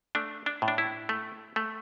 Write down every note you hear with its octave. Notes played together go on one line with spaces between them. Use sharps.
A3 D4
D4
A2
D4
E4
A3
A3